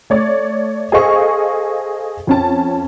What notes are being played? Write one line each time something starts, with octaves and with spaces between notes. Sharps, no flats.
A3 C#5 D5
G#4 A4 C5 D#5 F5 C#6
F2 C#4 A5